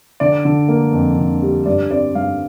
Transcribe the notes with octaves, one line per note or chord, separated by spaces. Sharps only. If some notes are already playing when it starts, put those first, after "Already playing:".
D3 D5
D3
A#3
F2
D3
G3
G2 D5
C4 D5
G2 F5